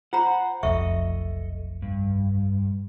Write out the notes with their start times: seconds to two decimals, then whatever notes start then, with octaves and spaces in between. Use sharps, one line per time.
0.13 F4 C5 F#5 A#5 B5
0.63 F1 B1 F2 A4 D#5 E5 C#6
1.82 G2